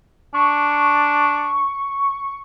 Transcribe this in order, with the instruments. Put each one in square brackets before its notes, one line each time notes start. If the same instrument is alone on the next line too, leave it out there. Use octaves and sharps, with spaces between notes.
[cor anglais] D4 [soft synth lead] C#6